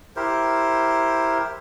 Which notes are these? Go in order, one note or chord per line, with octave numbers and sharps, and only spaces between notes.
E4 G4 A#4 C5